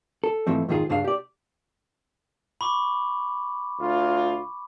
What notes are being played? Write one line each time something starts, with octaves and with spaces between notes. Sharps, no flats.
A4
G#2 E3 F3 A3 C4
F2 G#2 D#3 F4 G#4
C#2 G2 D4 G#4 F5
G4 D5
B5 C#6 D6
D2 F4